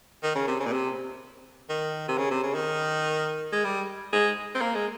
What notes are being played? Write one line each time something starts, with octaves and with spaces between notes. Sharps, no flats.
D#3
C#3
C3
C#3
A#2
C3
D#3
C3
C#3
C3
C#3
D#3
G#3
G3
G#3
C4
A#3
G#3